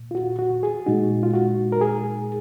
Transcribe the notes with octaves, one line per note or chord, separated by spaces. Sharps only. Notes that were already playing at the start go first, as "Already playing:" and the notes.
Already playing: A#2
F4
F#4
F#4
G#4
A#2 G#3 D#4 F#4
F4
F#4
A#4
G#4